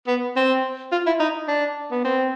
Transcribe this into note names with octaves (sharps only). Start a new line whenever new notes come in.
B3
C4
F4
E4
D#4
D4
B3
C4